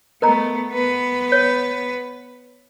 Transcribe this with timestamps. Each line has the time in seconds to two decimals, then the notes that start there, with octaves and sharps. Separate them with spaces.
0.22 A3 B3 A#4 D#5 A#5
0.72 B3 B4
1.32 C#5